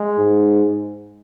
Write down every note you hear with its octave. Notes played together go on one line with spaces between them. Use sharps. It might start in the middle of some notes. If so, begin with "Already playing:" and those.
Already playing: G#3
G#2